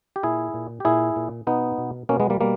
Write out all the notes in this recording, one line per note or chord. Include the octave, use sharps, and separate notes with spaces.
G4
A#2 E4 G#4
A#2
G4
A#2 E4 G#4
A#2
B2 B3 D#4
B2
B2 A#3 C#4
G#3 B3
G3 A#3
B2 G3 A#3